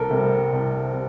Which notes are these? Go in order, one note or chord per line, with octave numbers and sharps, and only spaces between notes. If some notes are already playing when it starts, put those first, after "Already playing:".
Already playing: C2 A4 A#4
C3 G3
C2
C3